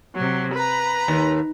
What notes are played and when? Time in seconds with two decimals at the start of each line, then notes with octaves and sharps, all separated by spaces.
0.15 C3 F#3
0.54 B4 A#5
1.08 D#2